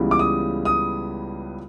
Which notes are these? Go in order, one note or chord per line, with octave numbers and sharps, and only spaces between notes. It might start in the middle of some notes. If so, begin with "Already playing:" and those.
Already playing: C#2 C#3 E3 G3 B3
D6
D#6
D#6